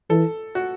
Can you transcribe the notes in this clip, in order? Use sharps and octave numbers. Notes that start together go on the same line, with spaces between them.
E3 A4
F#4